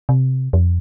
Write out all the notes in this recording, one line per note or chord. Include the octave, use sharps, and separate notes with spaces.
C3
F2